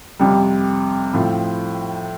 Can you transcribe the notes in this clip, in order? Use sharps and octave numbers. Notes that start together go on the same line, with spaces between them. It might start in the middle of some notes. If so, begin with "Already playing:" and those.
F2 C3 G3
A2 F3 C4